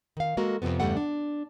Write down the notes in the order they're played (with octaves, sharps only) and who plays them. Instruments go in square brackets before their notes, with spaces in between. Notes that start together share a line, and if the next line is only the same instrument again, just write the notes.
[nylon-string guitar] D#3 F5
G#3 A#3 F#4 A4 A#4
F2 G#2 C3 F3 B3
E2 G2 C#3 G3 A3 F#5
D4